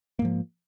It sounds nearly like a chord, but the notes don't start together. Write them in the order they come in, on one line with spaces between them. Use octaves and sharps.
A#3 G#2 F3